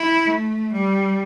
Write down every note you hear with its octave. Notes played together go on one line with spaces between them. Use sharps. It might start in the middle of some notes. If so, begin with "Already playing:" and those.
Already playing: E4
A3
G3